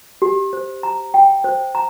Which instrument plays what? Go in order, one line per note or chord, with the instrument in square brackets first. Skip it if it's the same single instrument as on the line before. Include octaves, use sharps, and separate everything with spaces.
[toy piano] G4
C5
A#5
G5
C5
A#5